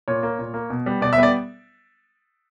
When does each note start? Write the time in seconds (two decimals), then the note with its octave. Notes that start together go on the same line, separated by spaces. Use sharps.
0.08 A#2 C#5
0.23 A#3
0.39 A#2
0.54 A#3
0.70 B2
0.86 G3 B3
1.01 B2 D5
1.13 E5
1.18 G3 B3 D5